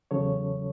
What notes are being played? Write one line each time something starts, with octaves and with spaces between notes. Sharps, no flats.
E2 C#3 F#3 A4 C#5